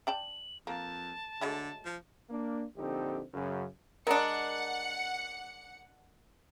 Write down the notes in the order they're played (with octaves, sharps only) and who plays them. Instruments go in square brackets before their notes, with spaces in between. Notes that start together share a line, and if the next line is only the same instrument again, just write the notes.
[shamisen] D4 G5 A5 [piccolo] F#7
[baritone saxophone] F2 [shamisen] A#3 [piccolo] A5
[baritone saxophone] D3 [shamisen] F#3 G#3 A3
[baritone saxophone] F3
[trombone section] A#3 D4
A#1 D3 C4 D#4 G4 A4
F#2 C#3
[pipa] G#3 D4 [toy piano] A#4 D#5 A#5 [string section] F#5 C#7